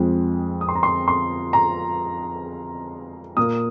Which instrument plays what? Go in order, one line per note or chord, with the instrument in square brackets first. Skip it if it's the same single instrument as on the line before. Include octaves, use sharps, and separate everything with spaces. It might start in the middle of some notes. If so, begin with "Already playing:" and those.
Already playing: [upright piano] F2 F3 G#3 C4
D#6
C6
A#5
C6
C6
A#5
A#2 A#3 D#6